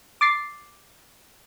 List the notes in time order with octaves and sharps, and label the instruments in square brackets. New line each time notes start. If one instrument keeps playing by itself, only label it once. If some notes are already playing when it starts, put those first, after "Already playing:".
[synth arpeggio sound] D6 A6 C7